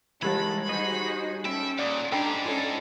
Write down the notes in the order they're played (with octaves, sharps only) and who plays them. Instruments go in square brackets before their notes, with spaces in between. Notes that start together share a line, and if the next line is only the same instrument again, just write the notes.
[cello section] D#3 [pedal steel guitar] E3 G#3 A5 [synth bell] G3 G4 G#6 [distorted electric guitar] B5
[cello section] D#4 F#4 G#4 [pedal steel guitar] C5 D#5
[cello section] C#4 A4 [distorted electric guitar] E5 [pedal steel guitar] G5 B5 [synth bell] D7
[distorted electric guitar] A#2 [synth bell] D5 [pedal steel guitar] F#5 D6 D#6
[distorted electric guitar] G#2 [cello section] D4 G4 [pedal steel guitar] A4 A#5 [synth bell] G5 B5 C7
[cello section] C#4 A4 [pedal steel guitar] F4 C#5 D5